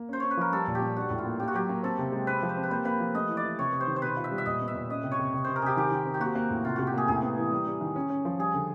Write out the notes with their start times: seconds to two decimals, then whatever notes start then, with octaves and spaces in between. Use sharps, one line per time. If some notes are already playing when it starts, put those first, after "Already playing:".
Already playing: A#3
0.09 C#4 C5
0.20 C#4 C#5
0.31 B4
0.37 F3 A#4
0.52 G3 A4
0.68 A#2
0.75 G4
0.82 G3
0.96 D4 F#4
1.10 A2
1.18 F4
1.26 A#3
1.40 A#3 G4
1.48 F#4
1.54 F#3 G4
1.69 A#3
1.83 C4 A4
1.99 C3
2.12 G#3
2.27 C4 B4
2.42 F3
2.49 C5
2.57 C4
2.63 B4
2.71 A#3 C5
2.85 A#3 B4
3.00 F3
3.14 A3 D#5
3.29 E3
3.37 D5
3.44 E3
3.59 C3 C#5
3.72 C3
3.81 C5
3.87 D#3
3.96 C5
4.02 B2 B4
4.17 F4
4.24 E5
4.31 G3
4.38 E5
4.46 A#2 D#5
4.61 B3
4.68 E5
4.75 A#2
4.89 C#4 D#5
5.04 C3
5.11 C#5
5.19 C3
5.34 C3
5.44 C3 C5
5.56 A#4
5.62 C3 G4 G#4
5.77 D#3 G4
5.91 D#3
6.06 C4
6.14 G4
6.20 A#3 F#4
6.35 A#3
6.50 A2
6.65 C3 F4
6.76 C3 F#4
6.87 G4
6.94 A#3 G#4
7.08 A2 G#4
7.23 B3
7.38 E3
7.52 G3
7.66 G3
7.81 D#3
7.96 C#4
8.10 C#4
8.25 F3
8.39 G3 G#4
8.54 D3